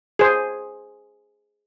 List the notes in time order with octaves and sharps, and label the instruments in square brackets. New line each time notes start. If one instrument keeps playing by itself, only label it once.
[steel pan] G#4 C5